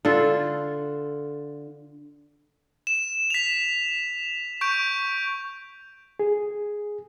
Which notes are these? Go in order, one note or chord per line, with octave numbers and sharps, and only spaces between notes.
D3 F4 A4
E7
B6 F7
C#6 G6 D7
G#4